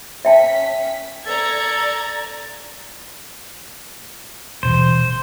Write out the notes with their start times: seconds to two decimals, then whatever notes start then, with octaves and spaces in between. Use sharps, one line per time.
0.25 C#4 E5 G5 A5 B6
1.26 A4 D5 A#5 G#6
4.63 D#1 B2 E3 C5